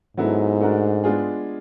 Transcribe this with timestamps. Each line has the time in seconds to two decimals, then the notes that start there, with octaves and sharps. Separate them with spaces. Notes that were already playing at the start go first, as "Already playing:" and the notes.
0.17 G#2 F#3 B3 E4 A4
0.61 A3 D4 F#4 A#4
1.04 G#3 B3 D4 F4 G#4